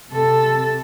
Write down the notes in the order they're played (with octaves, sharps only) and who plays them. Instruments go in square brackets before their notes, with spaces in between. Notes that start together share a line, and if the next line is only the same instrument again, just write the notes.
[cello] C3 A4